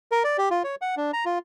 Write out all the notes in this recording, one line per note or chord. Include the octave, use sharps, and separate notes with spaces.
A#4
D5
G4
F4
C#5
F#5
D4
A#5
F4